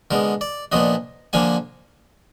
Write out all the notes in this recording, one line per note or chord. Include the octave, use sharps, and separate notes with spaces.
D3 G#3 B3 A#4
D5
A#2 F3 B3 D4 D#5
D3 F3 A#3 D4 G#5